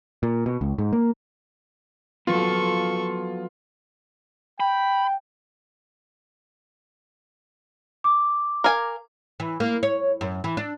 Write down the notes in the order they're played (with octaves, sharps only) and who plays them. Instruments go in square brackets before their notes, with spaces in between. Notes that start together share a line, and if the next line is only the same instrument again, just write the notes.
[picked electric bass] A#2
B2
C#2
G#2
A#3
[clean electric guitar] F3 F#3 B3 [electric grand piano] F4 [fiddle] A4 C#6
[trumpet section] G5 [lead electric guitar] B5
[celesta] D6
[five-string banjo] A#4 F5 G#5
[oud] E3
A#3
C#5
F#2
E3
D4